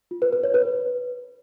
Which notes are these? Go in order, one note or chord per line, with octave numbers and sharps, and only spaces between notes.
F4
B4
B4
C#5
B4